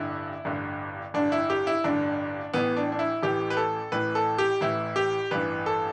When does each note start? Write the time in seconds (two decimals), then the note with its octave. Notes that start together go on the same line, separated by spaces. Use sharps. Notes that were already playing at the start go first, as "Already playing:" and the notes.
Already playing: A1 G2 D3 E4
0.45 A1 G2 D3
1.14 A1 G2 D3 D4
1.32 E4
1.50 G4
1.67 E4
1.84 A1 G2 D3 D4
2.53 A1 A2 E3 B3
2.77 D4
2.92 D4
2.99 E4
3.23 A1 A2 E3 G4
3.50 B4
3.57 A4
3.92 A1 A2 E3 B4
4.15 A4
4.38 G4
4.61 A1 A2 E3 E4
4.96 G4
5.31 A1 G2 E3 B4
5.66 A4